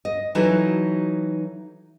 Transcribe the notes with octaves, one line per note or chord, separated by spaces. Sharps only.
D#5
E3 F#3 D#4 E4 F#4 A4